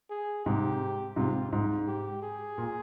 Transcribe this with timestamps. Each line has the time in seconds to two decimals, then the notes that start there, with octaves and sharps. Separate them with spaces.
0.10 G#4
0.46 G#2 C3 G4
1.16 G#2 C3 F4
1.52 G#2
1.87 G4
2.23 G#4
2.58 A#2